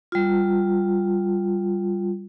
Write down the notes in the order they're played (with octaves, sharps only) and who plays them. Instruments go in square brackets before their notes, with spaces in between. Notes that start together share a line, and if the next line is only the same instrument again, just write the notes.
[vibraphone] G3 F4